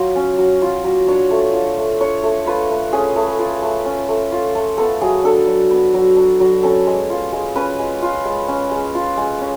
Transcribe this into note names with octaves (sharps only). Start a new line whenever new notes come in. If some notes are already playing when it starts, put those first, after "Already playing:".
Already playing: F#3 F4
C#4
F#3
F4
F#3
D4 C#5
A3
F4
A3
D4 C#5
A3
F4 B4
A3
C#4 G#4
A3
F4
A3
C#4
A3
F4
A3
B3 A4
F#3 G#4
D4 A4
F#3
B3
F#3
D4
F#3
C#4 A4
G#3
F4
G#3
C#4 B4
G#3
F4
G#3
C#4
G#3
F4
G#3
C#4